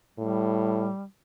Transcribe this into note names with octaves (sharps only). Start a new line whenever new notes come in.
A2 G3